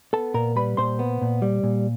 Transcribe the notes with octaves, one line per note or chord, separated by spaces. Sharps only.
B3 A4 A5
A#2 A#4 A#5
G3 B4 B5
A#2 C5 C6
B3
A#2
G3
A#2